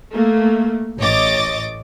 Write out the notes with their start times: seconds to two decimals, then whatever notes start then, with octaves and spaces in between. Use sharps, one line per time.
0.13 A3 A#3
0.99 A1 C#5 D#5 D6 A6